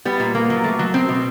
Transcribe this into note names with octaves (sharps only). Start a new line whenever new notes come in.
G3 B3
A#2
A#3
F#3
A3
F#3
B2 C4
B2